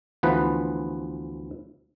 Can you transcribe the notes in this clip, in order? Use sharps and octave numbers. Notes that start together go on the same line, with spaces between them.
D2 E3 F3 B3 B4